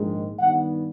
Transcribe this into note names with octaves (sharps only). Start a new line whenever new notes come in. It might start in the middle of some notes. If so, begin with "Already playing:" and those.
Already playing: A#1 G#2 D#3 G#3
G2 D#3 G3 B3 F#5